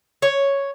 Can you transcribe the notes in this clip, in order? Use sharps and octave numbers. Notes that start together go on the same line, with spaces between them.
C#5